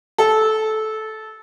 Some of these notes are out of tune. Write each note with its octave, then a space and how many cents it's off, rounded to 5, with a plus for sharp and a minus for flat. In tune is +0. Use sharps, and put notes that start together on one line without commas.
A4 -15